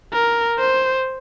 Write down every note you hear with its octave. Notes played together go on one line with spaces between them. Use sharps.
A#4
C5